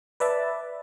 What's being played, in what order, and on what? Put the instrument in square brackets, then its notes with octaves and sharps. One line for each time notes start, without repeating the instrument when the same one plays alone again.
[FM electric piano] B4 D5 E5 A5